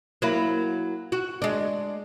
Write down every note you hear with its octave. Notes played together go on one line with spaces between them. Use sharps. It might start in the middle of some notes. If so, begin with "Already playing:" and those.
F#3 A#3 E4
F#4
G#3 D4